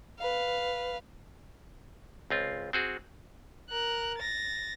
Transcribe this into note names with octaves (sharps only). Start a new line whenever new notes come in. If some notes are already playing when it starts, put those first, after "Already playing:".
B4 F5
C#2 C4 F4
C4 F#4 G#4
A#4 F#6
A6 A#6